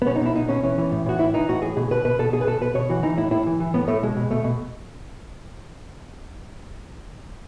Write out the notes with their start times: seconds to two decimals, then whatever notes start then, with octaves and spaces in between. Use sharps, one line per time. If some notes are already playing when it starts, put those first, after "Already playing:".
0.02 B3
0.07 B2 C#4
0.16 D#4
0.21 B2 E4
0.35 B2 D#4
0.49 B2 C#4
0.63 E3 C#4
0.78 E3
0.92 A2
1.06 A2 F#4
1.19 E3 E4
1.34 E3 D#4
1.49 A2 F#4
1.62 A2 G#4
1.77 B2 G#4
1.91 B2 B4
2.05 B2 B4
2.19 B2 A4
2.32 B2 G#4
2.41 B4
2.47 B2 A4
2.61 B2 B4
2.75 B2 C#5
2.89 E3 F#4
3.03 E3 D#4
3.17 A2 E4
3.31 A2 E4
3.46 E3
3.60 E3
3.74 A2 B3
3.88 A2 A3
4.03 B2 G#3
4.17 B2
4.31 B2 A3
4.44 B2